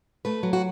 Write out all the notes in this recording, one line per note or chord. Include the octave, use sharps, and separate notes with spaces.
A3 B4
F#3
F#4